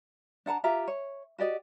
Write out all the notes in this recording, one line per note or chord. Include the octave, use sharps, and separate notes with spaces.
D4 F#5 A5 A#5
F4 G4 E5 A#5
C#5
F#4 G4 D5 D#5